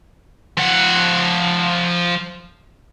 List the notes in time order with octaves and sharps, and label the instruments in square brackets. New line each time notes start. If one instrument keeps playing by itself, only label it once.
[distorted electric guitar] F3 F#5